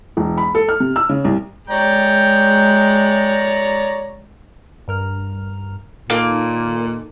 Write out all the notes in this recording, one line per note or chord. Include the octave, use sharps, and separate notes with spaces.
E1
B5
A4
F6
C3
E6
C#3
C2
G#3 C#5 D5 G5 A#5
G2 A#4 F6
A#2 D#3 A#3 D#4 A4